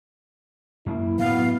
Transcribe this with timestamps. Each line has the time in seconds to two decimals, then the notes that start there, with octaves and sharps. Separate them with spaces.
0.86 F#2 A#3 E4
1.19 A2 F#3 B3 F5